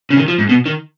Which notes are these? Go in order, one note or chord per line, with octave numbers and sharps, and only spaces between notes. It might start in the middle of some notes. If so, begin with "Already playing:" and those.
C#3
D#3
F3
G#2
B2
D#3